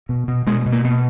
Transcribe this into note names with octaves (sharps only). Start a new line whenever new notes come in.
B2
B2
B2 G#3
B2
A#3
B2